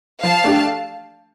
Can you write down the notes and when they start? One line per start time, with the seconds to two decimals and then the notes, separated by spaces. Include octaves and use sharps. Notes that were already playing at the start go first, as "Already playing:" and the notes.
0.22 F3 F5 A5
0.44 A3 D4 G4